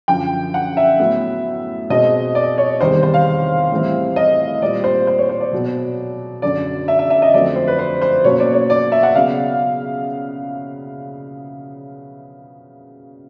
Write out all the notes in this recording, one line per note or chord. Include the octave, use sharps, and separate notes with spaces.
F#2 D3 F3 G5
F#5
E5
A2 F#3 B3
B2 G#3 C4 D#5
D5
C#5
E2 C3 D#3 G3 C5
C5
F5
A2 E3 G3 C4
D#5
A#2 G3 C4 D5
C5
C5
C#5
C5
D5
B2 F#3 B3
F#2 D3 F#3 D5
E5
E5
E5
D#5
F2 D3 F#3 A3 C4 D5
C5
B4
C5
C5
B2 F#3 A#3 C#4 C#5
D5
C#5
D5
E5
F#5
C#3 F#3 B3 F5